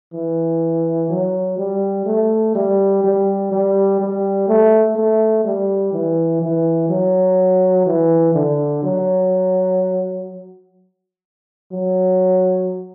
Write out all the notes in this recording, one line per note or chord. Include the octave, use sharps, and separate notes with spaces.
E3
F#3
G3
A3
G3
G3
G3
G3
A3
A3
G3
E3
E3
F#3
E3
D3
F#3
F#3